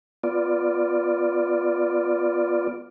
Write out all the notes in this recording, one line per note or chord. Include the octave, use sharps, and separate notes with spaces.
B3 F4 D5